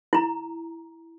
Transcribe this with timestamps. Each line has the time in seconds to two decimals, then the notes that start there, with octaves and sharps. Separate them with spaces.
0.13 E4 A#5